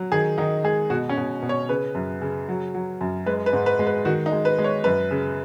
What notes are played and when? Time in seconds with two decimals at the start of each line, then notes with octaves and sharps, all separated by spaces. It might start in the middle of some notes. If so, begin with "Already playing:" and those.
Already playing: F#3
0.12 D#3 G#4
0.38 D#3 D#4
0.64 G#3 G#4
0.90 B2 F#4
1.09 C#4
1.17 B2
1.42 B2
1.49 C#5
1.69 C#3 B4
1.95 F#2
2.21 C#3
2.49 F#3
2.74 F#3
3.01 F#2
3.26 G#3 B4
3.46 B4
3.53 G#2
3.66 B4
3.79 G#3
3.87 B4
4.05 D#3 F#4
4.26 D#4
4.32 G#3
4.45 B4
4.58 G#3
4.64 C#5
4.84 F#2 B4
5.11 C#3